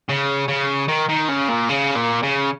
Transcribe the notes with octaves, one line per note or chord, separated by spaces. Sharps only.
C#3
C#3
D#3
D#3
C#3
A#2
C#3
A#2
C#3